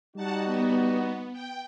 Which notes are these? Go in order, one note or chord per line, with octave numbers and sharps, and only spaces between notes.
G3 D#4 F#4 F#5 A5
B3
G5